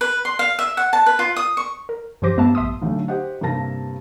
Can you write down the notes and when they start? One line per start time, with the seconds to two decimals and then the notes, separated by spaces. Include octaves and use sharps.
0.01 B4
0.25 C6
0.39 F5
0.59 E5
0.77 F#5
0.93 A5
1.06 B4
1.19 F4
1.36 D#6
1.57 C#6
1.89 A#4
2.22 G2 F3 G4 C5 D6 A#6
2.37 G2 A3 B3 E5 F5 A5
2.55 A#1 E5 C6 D#6
2.82 B1 D3 F#3 A3
3.08 G4 C5 D#5 F#5
3.41 G2 C3 A#3 A5 A#6